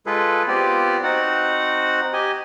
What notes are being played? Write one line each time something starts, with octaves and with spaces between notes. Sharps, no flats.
G#3 F4 G#4 A4 B4
B3 C4 F4 G4 D5
C4 D#4 F#4 F#5
G4 D#5 G#5